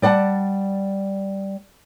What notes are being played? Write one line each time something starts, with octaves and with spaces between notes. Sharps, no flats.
G3 D5 F#5 A5